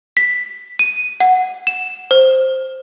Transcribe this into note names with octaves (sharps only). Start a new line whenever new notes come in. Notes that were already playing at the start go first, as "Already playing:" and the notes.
B6
D#7
F#5
E7
C5